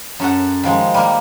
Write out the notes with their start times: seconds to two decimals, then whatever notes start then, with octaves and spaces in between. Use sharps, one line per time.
0.20 F#2 A4 F#5
0.63 D#3 F3 G#3
0.94 G3 A#3